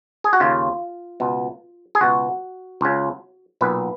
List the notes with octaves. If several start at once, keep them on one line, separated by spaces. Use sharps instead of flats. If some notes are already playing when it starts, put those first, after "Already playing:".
G#4
F#4
D#2 C#3 F4
C#2 B2
G#4
C#2 B2 F#4
C#2 C#3
B1 A#2 B4